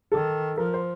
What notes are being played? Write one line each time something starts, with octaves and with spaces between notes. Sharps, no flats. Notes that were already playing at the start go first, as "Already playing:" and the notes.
D#3 A4
F3 A#4
C5